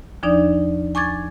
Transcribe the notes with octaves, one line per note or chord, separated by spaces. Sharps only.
E2 F3 D4 D#4 D5
G#5 C#6 D6 G#6 A6